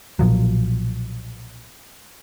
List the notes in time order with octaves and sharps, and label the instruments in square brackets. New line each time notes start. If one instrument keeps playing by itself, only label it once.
[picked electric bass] B1 A#2 F3 F#3